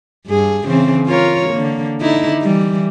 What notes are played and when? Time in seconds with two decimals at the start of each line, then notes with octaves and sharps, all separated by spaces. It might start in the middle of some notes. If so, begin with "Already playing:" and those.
0.27 G2 G#4
0.66 C#3 E3 C4
1.07 F4 A#4 C#5
1.50 D3 A#3
2.01 D3 D#4 E4
2.42 E3 G3